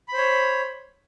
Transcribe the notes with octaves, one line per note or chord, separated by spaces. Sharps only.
C5 C#5 B5